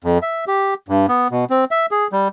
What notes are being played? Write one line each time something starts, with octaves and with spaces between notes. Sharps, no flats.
F2
E5
G4
G2
B3
B2
C4
E5
G#4
G3